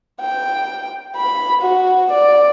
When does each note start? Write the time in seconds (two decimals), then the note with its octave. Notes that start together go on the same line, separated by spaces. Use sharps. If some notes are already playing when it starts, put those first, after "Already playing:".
0.21 G5
1.16 B5
1.62 F#4
2.12 D5